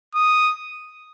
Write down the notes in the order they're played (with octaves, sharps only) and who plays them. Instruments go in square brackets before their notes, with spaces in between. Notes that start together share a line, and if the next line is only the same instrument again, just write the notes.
[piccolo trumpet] D#6